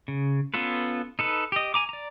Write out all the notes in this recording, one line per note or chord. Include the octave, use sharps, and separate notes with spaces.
C#3
B3 C#4 F4 A4 B4
D#4 A4 B4
G4 D#5
G#5 A#5 D6
D5 A#5